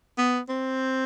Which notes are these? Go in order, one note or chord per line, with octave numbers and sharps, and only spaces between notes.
B3
C4